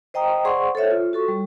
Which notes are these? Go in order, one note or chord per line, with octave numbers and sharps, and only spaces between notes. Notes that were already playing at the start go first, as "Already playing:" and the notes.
C5 D#5 G5 A#5 D#6
G#4 C5 D5 F#5 C6 C#6
A4 C5 C#5 E5
F4
F#4 A4 C#6
G3